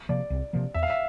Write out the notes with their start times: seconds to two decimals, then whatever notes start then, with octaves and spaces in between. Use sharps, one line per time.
0.09 C3 F3 A#3 D5
0.30 C2
0.53 C3 F3 A#3
0.74 E2 E5
0.83 F5
0.90 E5